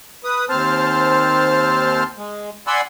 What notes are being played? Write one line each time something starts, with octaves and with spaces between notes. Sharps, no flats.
B4 D#6
D#2 C4 C5 A5 F6
G#3
D5 F#5 G#5 B5 C6 E6